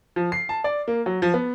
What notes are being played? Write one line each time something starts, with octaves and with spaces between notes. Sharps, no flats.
F3
C7
A5
D5
A#3
F#3
F3
B3